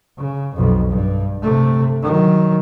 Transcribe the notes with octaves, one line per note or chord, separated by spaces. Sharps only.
C#3
B1 F2
G2
C3 A3
D#3 F#3